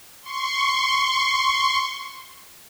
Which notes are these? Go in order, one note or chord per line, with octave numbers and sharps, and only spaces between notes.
C6 C#6